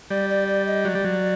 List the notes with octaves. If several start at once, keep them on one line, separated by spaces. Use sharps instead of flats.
G3 D5
D5
D5
D#5
F#3 D5
G3
F#3